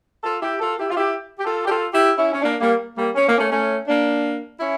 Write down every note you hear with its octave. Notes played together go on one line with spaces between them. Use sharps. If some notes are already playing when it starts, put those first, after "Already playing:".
F4 A4
E4 G4
F4 A4
E4 G4
F4
E4 G4
G4
F4 A4
G4
F4 A4
E4 G4
C#4 E4
C#4
A#3 D4
G3 A#3
G3 A#3
C#4
A#3
A3 C#4
A3 C#4
A#3 D4
C#4 E4